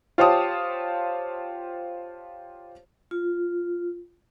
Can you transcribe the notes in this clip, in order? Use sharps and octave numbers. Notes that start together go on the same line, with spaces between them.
F4 G4 C5 C#5 A5 D#6
F4